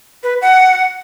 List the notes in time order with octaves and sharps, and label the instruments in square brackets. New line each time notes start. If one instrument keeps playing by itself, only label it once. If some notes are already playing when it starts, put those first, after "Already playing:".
[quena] B4
F#5